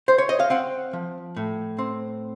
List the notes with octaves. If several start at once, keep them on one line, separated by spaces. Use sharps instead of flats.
C5
C#5
D#5
F5
C4 F#5
F3
A2
C4